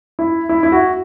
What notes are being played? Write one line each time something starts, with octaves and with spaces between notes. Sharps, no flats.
E4
E4
E4
F#4